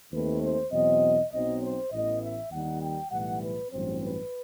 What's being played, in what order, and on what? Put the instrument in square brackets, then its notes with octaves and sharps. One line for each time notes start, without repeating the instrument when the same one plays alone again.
[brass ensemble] D#2 D#3 A3 C4 B4
C5
E2 B2 F#3 C4 D#5
B1 B2 F#3 C4 D#4 D#5
C5
A1 A2 E3 B3 D#5
E5
D#2 D#3 G3 D#4 F#5
G5
B1 A2 E3 G3 F#5
B4
A1 G2 F#3 C4 C5
B4